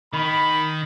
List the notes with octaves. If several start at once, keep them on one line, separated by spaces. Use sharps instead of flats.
D#3 B5